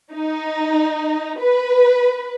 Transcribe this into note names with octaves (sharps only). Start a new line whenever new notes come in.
D#4
B4